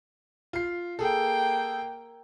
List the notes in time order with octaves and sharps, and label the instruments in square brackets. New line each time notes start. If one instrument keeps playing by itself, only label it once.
[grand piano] F4 C7
[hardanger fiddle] A#3 G5 [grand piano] G#4 A4